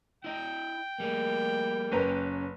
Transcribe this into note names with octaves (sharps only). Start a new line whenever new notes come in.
E4 D#5 G5
G3 A#3 G#4
F#1 C#4 B4 A#5